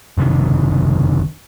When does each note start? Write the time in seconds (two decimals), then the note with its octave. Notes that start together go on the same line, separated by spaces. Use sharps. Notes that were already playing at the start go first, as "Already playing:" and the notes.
0.18 F#1 C3 D#3